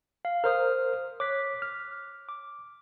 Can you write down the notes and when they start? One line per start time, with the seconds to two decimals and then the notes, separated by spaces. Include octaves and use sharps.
0.25 F5
0.44 A#4 C5 D#6 F6
1.20 C#5 D6 F#6 B6
1.62 F6
2.29 D6